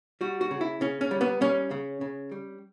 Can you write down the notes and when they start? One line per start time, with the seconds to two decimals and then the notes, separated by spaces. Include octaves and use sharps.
0.21 G3 F#4
0.41 F#4
0.51 C#3
0.61 E4
0.81 C#3 C#4
1.01 C#4
1.11 G3
1.21 B3
1.41 G3 C#4
1.71 C#3
2.01 C#3
2.32 G3